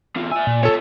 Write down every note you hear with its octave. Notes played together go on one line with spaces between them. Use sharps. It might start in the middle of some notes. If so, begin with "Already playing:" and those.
E2 F4
D5 E5 G#5
A#2
B3 F4 A4 C#5